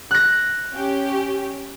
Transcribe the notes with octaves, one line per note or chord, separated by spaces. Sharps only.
F#6 A#6
C#4 G4